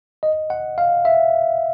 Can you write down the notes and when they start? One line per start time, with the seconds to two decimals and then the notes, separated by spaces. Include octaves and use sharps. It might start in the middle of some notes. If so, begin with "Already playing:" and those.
0.23 D#5
0.50 F#5
0.78 F5
1.05 E5